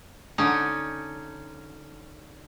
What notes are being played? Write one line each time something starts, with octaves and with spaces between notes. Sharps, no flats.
D3 C#4 D#4